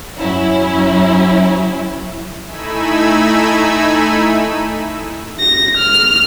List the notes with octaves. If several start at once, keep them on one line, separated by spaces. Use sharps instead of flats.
F#2 F#3 C#4 E4
A3 D#4 E4 G#5 B5 E6
A#6
F6